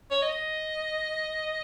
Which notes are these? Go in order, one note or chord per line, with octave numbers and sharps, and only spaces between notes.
C#5
D#5